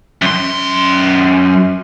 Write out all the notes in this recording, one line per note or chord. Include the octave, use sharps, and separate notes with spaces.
F#2 C6